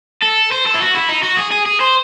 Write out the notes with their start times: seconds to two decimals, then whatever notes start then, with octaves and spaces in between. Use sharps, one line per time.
0.22 A4
0.51 C5
0.66 A4
0.74 E4
0.80 F#4
0.95 E4
1.09 D#4
1.23 F#4
1.37 G#4
1.52 G#4
1.66 G#4
1.81 C5